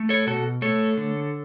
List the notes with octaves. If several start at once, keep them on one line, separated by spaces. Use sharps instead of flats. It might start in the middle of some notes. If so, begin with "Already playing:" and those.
Already playing: A3
A4 C#5
B2 F#4 A4
A3 A4 C#5
D3